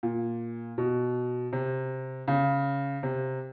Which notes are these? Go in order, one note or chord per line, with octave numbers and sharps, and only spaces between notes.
A#2
B2
C3
C#3
C3